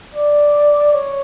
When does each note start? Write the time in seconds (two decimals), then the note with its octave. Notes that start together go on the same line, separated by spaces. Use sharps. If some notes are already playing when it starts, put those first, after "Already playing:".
0.14 D5
0.93 C#5